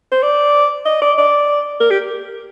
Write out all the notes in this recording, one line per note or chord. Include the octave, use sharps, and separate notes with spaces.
C5
D5
D#5
D5
D5
A#4
G4